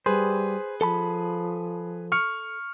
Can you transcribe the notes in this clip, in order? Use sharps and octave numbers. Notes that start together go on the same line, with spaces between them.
G3 G#4 B4 C5
F3 A4 A5 B5
C#6 F6 C#7